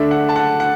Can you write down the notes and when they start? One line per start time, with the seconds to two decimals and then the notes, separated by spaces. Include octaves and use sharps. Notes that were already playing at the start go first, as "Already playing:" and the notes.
Already playing: D3 A3 D4 E5
0.11 F#5
0.29 A5
0.36 F#5
0.60 F#5